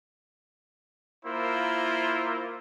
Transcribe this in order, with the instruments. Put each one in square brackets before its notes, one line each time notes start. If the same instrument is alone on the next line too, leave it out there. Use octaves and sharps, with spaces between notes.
[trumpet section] A#3 E4 F4 A#4 C5